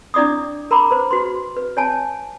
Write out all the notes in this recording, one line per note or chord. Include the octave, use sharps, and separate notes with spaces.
D4 E4 D5 D6 D#6
A#4 A#5 B5 D6
B4 C5
F#4 B4 C6
B4
C#5 G#5 A5